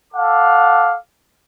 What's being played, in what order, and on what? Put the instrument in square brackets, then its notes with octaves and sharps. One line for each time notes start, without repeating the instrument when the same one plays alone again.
[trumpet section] A4 F5 F#5 D6